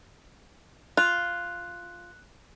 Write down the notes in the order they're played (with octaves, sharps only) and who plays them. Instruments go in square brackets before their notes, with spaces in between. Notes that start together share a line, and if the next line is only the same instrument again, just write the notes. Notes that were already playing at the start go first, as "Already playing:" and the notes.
[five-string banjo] F4 [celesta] F#6